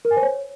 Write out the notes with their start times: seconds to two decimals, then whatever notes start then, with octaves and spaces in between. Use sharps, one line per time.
0.05 A#4
0.11 G#5
0.17 C5
0.23 C#5